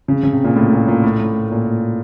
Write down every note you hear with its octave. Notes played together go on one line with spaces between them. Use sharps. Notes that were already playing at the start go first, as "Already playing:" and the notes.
C#3
C#3
C3
A#2
A2
A#2
A#2
A2
A2
A#2